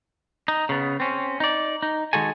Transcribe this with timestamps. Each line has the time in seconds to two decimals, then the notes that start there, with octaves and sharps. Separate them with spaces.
0.48 D#4
0.69 C#3 B3
1.00 C4 C#4
1.40 D#4 D5
1.83 D#4
2.13 D#3 G#3 F#4 A4 G#5